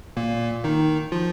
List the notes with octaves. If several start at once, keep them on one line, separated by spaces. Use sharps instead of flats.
A#2 A#3
D#3 D#4
F3 F4